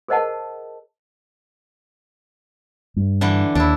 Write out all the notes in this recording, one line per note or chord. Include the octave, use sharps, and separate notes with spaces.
G#4 A#4 C5 D#5 F#5 A5
G2
D3 E3 D4
D#2 D4 E4